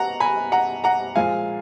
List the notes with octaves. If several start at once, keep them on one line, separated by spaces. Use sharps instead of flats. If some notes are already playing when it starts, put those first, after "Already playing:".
Already playing: B2 F#5 A#5
G#5 B5
F#5 A#5
F#5 A#5
A#2 F3 G#3 F5 G#5